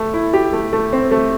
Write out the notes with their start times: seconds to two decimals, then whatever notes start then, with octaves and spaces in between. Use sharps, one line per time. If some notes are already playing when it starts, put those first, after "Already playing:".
Already playing: A3
0.14 E4
0.33 G4
0.53 A3
0.73 A3
0.93 C4
1.11 A3